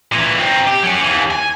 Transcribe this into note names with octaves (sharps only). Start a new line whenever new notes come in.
A#2 E3
C4 D#4
G4
F#3 C#4
D#2 E3
G#5